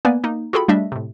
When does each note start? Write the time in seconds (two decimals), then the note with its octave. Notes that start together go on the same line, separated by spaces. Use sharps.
0.05 A#3 B3 B4 D5 G#5
0.24 A#3 D#4
0.53 F4 F#4 G#4 A4 G5 B5
0.68 G3 A3 D4 D#5 E5
0.92 A2 C3